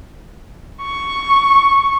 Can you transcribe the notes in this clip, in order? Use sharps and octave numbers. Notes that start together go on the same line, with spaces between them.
C#6